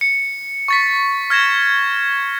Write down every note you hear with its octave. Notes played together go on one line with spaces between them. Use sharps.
C#7
C#6 A6 B6
F6 G#6 A#6 E7